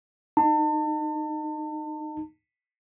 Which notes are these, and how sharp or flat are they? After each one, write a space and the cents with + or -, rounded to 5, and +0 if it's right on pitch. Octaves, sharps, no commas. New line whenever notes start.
D#4 -15 A5 +35